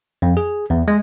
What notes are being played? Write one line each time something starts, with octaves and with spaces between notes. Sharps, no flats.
F2
G#4
E2
G#3